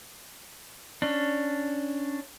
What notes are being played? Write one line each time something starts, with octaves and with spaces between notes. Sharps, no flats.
C#4 D4